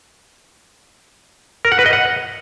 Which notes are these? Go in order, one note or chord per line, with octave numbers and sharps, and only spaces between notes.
A#4
F#5
B4
D#5
F#5